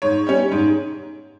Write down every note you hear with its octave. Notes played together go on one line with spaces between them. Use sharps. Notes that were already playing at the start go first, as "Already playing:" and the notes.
G#2 C#5
G3 C#4
G#2